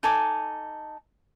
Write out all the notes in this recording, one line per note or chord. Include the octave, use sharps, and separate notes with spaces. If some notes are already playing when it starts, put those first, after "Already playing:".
D#4 A4 G#5 D6